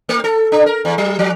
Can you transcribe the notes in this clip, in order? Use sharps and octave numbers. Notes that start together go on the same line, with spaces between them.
A3
A4
D4
A#4
E2
F#3
F3